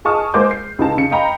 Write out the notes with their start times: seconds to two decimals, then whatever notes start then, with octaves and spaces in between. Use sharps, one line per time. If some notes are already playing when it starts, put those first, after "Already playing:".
0.05 G#4 D#5 A5 C#6 D#6 F6
0.34 G#3 A#3 G#4 C5 D6 G6
0.51 C7
0.79 C#2 D#4 A5
0.97 C#3 C#7
1.11 D#5 F5 G5 A#5 B5